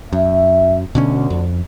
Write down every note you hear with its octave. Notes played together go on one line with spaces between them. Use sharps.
F#2 E5
D2 B2 D3 C#4
F2